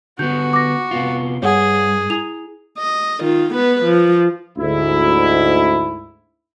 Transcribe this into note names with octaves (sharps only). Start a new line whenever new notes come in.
D3 B3 F#4 G6
D6 A#6
C3 B3 F4
G2 G#4 C#5 F#5
E4 F7
D#5
D#3 F4
B3 B4
F3
D2 G#2 E4